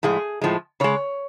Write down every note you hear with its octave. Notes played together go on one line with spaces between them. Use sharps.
A2 F3 G#3 G#4
A2 F3 G#3
C#3 G#3 C#5